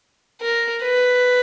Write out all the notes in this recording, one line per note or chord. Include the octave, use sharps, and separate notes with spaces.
A#4
B4